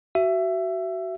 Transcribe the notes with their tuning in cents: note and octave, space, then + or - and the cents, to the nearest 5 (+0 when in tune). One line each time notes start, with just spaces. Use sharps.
F#4 +25 E5 +20